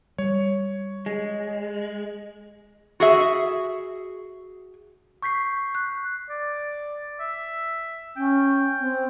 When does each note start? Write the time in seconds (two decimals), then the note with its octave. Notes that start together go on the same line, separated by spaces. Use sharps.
0.18 G3 C#5
1.06 G#3
3.00 F#4 G#4 E5
5.22 C#6 G6 B6 C7
5.75 F#6
6.30 D5
7.20 E5
8.17 C#4 G5
8.80 C4